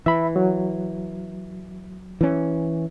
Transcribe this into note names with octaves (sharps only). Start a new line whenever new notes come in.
E3 E5 B5
F#3
E3 C#4